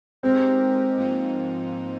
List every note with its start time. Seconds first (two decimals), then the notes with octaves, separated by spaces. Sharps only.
0.23 G#3 C4 D#4 G4 A#4
0.97 G#2 F3 A#3 D#4